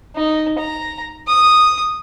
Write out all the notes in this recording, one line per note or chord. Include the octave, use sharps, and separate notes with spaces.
D#4
A#5
D#6